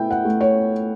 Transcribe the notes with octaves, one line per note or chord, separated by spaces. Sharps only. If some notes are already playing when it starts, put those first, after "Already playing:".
Already playing: B2 A3 E4 G5
F#5
A3
C#5